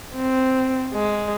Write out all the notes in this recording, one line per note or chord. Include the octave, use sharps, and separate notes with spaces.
C4
G#3